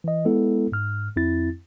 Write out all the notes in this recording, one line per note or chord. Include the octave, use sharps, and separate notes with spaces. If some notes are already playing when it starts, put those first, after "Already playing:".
E3 D#5
G#3 B3 E4 A4
G#2 F6
F2 C4 E4 A6